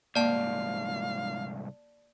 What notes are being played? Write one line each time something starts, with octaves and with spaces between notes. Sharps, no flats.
C2 G#2 A#3 D5 F5 A5